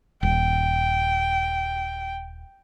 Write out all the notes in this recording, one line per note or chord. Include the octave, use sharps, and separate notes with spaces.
D#1 G5